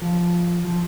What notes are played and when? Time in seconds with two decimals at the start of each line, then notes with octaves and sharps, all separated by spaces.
0.02 F3
0.65 F3